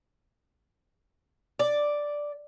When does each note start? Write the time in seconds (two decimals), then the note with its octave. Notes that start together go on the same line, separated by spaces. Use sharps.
1.59 D5